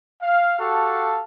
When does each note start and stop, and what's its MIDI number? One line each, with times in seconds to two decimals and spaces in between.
0.22 0.57 77
0.60 1.22 66
0.60 1.22 67
0.60 1.22 69
0.60 1.22 77
0.60 1.22 81